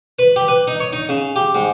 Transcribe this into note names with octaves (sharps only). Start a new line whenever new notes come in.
B4
G4
B4
D#4
C#5
D#4
C#3
G4
G#2